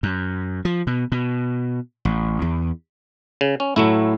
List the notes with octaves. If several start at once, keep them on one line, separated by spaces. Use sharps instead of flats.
F#2
F3
B2
B2
A1
E2
C#3
C#4
A2 F#3 A3 E4